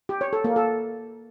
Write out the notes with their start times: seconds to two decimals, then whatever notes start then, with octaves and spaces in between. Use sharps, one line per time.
0.09 G4
0.21 C#5
0.33 A4
0.44 A#3
0.56 A4